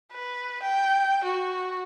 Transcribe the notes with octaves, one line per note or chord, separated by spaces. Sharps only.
B4
G5
F#4